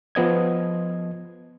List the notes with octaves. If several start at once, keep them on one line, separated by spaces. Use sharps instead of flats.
F3 B3 D#5 G#6